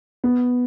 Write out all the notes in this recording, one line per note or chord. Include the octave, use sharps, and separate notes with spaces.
B3